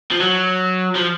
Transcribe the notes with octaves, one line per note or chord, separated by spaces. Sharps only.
F3
F#3
F3